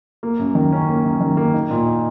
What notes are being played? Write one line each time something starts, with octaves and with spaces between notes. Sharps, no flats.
A#3
F#2
D#3
C#4
A#3
F#2
D#3
A#3
D#4
A#2
D#4